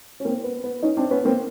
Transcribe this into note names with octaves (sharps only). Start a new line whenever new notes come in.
C#4
A#3 C4
B3
B3
C#4 D#4
C4 D4
B3 C#4
A#3 C4